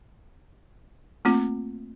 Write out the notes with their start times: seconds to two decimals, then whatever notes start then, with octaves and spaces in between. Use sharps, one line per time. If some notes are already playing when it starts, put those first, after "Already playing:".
1.25 A3 A#3 C4 F4